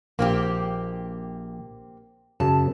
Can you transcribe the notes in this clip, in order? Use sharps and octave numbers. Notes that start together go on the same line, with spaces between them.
A#1 A#3 C4 G4
F#2 C#3 A5